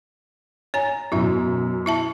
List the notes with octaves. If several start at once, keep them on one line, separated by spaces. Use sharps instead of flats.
C#5 G#5 A#5
F#2 B2 E4 E5
E4 E5 A5